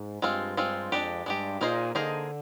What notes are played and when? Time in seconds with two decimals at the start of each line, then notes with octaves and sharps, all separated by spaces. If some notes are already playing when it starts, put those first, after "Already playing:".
Already playing: G#2
0.22 G2 G#3 C4 F4
0.57 G#3 C4 F4
0.91 F2 G#3 D4 G4
1.26 G2 G#3 D4 G4
1.61 A#2 A#3 D#4 G#4 C5 D#5
1.95 D3 A#3 D#4 G#4 C5 D#5